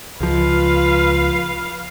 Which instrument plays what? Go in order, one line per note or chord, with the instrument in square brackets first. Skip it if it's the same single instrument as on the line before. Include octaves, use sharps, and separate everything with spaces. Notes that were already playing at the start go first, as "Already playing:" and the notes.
[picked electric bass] C#2 F3 [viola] B4 F5